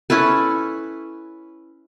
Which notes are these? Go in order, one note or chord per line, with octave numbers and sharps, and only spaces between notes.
C#4 E4 A4 B4